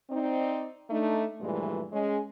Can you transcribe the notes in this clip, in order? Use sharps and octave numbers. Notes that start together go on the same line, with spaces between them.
C4 D#4 D5
A3 D4 D#4
G2 A#2 E3 F3 G#3 A3
G#3 C#4